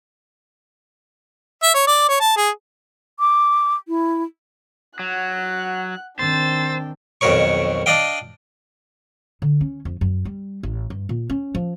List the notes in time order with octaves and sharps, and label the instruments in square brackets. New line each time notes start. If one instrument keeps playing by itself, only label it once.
[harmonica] E5
C#5
D5
C#5
A5
G#4
[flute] D6
E4
[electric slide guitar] F#3 [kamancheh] F#5 F#6
[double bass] D#3 C4 [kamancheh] D4 G5 [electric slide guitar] C5 [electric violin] E6 A6
[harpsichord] B1 F2 D#3 A#4 C#5 C#6
D4 D5 D#5 F5 G5
[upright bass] D3
C#4
F2
F#2
G3
A1
G2
A#2
C#4
F3